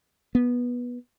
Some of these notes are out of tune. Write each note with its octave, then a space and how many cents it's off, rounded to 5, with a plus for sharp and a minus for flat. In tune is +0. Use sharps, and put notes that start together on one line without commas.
B3 -15